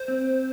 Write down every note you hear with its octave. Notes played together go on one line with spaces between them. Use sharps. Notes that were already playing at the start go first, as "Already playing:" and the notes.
Already playing: C5
C4